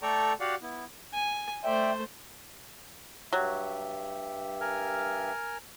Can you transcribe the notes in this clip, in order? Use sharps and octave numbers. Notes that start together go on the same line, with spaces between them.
A3 A4 D5 G5 A#5 C#6
F#4 G4 D5 F5 F#5
B3 E4
G#5
A3 C5 D5 E5 G5
G2 F#3 G4 E5
A#4 G#5 F6